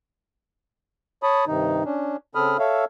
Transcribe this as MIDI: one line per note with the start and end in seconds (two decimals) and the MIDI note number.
1.23 1.45 73
1.23 1.45 81
1.23 1.45 83
1.23 1.45 87
1.47 1.84 43
1.47 1.84 48
1.47 1.84 51
1.47 1.84 63
1.85 2.17 61
1.85 2.17 62
2.35 2.57 49
2.35 2.57 60
2.35 2.57 69
2.35 2.57 83
2.35 2.57 87
2.35 2.57 89
2.59 2.85 69
2.59 2.85 73
2.59 2.85 76
2.59 2.85 77